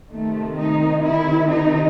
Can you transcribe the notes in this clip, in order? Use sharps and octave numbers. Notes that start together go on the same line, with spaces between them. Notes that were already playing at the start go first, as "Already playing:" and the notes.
C3 D#3 A3
D#4
E4
D#4